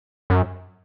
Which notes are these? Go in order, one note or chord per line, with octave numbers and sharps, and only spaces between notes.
F#2